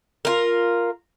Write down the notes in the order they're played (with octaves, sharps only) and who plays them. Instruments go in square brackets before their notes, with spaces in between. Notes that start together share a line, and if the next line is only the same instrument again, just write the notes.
[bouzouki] F4 A#4